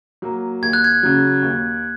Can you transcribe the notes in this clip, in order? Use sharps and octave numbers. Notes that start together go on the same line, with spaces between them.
F#3 A#3
D#2 G#6
F#6
G#6
C#3 F#3
D#2